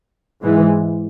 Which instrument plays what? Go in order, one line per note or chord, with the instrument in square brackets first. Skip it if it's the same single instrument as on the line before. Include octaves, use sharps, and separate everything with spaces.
[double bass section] G#2 E3 G#3